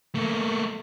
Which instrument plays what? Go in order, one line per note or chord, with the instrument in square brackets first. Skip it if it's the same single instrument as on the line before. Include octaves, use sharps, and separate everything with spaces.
[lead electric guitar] A3 A#3